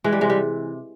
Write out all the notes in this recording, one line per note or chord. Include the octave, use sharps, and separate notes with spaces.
E3 G#3
G3
C3 G#3
G3